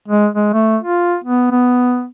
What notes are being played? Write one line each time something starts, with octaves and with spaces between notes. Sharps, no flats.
G#3
G#3
A3
F4
B3
B3